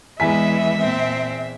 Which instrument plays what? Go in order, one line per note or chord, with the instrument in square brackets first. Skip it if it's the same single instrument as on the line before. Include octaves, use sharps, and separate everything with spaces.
[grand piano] E2 G#5 B6 [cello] E3 G#3 [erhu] E5
[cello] A#2 C4